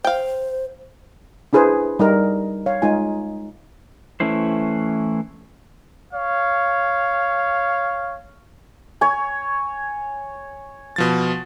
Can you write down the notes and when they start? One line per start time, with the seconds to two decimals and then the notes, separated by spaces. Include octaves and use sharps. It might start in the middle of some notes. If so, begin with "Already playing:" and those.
0.04 C5 F5 G5
1.53 D4 E4 G#4 B4 C5
1.99 G3 D#4 A#4
2.66 C#5 F5
2.82 G#3 D#4 F4 G#5
4.20 E3 A3 C#4 E4 C5
6.14 C#5 F5
9.01 C#5 G#5
10.96 B2 F3 A6